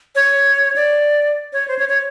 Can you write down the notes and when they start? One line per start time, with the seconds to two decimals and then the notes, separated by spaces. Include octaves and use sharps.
0.15 C#5
0.76 D5
1.53 C#5
1.68 C5
1.79 C#5
1.89 C#5